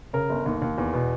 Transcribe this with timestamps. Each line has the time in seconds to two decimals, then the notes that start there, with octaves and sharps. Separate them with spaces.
0.13 C#3 A#4
0.30 G1
0.46 D#2
0.62 D#2
0.78 E2
0.94 B2